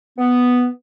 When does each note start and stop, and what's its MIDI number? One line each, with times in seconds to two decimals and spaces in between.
0.19 0.67 59